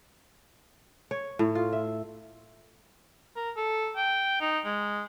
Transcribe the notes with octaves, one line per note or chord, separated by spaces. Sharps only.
C#5
A2
F4
E5
A#4
A4
G5
D#4
G#3